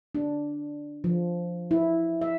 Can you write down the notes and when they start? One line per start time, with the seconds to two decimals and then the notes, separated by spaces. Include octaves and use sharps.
0.15 D4
1.04 F3
1.71 E4
2.21 E5